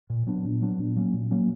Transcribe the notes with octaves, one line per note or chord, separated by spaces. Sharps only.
A#2
F#3 B3 D4
A#2
F#3 B3 D4
A#2
F#3 A#3 C#4
A#2
F#3 A#3 C#4